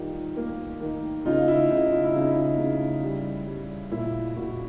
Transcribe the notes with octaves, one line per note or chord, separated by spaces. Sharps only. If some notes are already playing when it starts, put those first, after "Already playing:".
Already playing: D#3 G3 F4 G4
A#3
D#3
C#3 D#4 F4
E4
C#3 D#4
F4
E4
C#3 D#4
E4
C#3
G3
G3
A#2 E4
A#2 E4 F#4